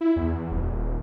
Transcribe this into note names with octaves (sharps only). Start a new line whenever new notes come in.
E4
E2
D#1